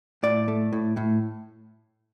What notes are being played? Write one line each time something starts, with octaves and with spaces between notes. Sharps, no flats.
A2 D5
A3
A2
A2